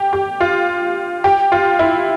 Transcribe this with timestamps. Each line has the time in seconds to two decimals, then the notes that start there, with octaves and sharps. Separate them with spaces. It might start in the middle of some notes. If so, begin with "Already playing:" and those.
Already playing: G4
0.13 G4
0.41 F4
1.24 G4
1.52 F4
1.79 E4